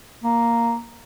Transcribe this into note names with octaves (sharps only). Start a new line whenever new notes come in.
A#3